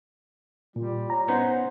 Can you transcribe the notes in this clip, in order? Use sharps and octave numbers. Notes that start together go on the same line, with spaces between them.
A#2 G3 F4
C#5 A#5
B3 C#4 D#4 C5 F#5